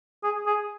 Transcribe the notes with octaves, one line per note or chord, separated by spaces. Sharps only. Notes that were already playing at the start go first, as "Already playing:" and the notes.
G#4
G#4